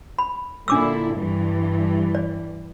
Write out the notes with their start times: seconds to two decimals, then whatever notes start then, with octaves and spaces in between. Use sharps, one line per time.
0.19 B5
0.68 A#2 D3 D4 E4 D6 E6
1.16 G2 E3 G3
2.15 D5